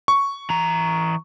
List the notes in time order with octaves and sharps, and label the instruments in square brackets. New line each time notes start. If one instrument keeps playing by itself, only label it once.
[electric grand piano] C#6
[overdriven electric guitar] E3 A#5